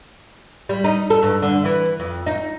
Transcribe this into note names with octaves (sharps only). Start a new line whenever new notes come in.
G3
D#4
A4
G2
D3
E3
F2
D#4